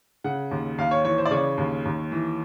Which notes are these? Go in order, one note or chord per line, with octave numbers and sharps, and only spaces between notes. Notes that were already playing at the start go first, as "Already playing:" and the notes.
C#3 F#5
D#2
D#2 F5
C#5
E3 C#5
C5
D5
C#3 C#5
D#2
D#2
E3